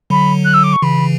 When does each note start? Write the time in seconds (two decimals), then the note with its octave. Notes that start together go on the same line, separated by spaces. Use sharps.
0.10 D3 F#3 B5
0.44 F#6
0.53 E6
0.63 D6
0.72 C#6
0.82 C#3 E3 B5